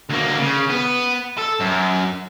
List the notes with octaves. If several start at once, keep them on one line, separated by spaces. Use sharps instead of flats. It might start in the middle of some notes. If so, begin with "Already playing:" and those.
D2 A#3
C#3
B3
A4
F#2